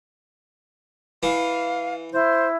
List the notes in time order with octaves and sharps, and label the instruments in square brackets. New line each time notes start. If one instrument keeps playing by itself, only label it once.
[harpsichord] E3 [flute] F5
[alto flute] E4 [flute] C5